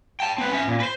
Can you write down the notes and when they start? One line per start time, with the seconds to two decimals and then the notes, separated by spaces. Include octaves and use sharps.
0.20 G5 A5
0.38 C4 B4
0.52 C#4 E5
0.68 A#2
0.80 B4 C5